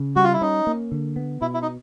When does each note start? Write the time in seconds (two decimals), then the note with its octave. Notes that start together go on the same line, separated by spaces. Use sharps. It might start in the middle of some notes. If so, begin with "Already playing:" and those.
Already playing: C#3
0.16 G3 F#4
0.24 F4
0.33 E4
0.41 C#4 D#4
0.67 A#3
0.92 D3
1.16 B3
1.41 B2 E4
1.54 E4
1.62 D#4